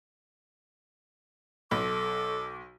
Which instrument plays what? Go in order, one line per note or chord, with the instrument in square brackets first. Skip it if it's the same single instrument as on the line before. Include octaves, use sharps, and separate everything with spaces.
[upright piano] B1 [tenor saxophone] A4 [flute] D6